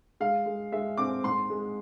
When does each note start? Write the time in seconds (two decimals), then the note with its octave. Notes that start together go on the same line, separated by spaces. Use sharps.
0.20 G#3 F5
0.46 G#3
0.72 G#3 E5
0.98 C4 D6
1.24 G#2 C6
1.50 G#3